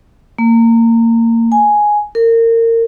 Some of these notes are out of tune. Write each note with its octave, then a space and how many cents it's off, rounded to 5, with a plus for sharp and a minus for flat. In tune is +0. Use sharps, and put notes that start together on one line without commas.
A#3 -25
G#5 +5
A#4 -30